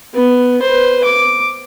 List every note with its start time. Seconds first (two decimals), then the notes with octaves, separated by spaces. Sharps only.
0.14 B3
0.62 B4 C5
1.04 D6